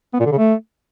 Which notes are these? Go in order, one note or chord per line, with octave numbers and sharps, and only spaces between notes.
B3
A#2
D3
C#3
A3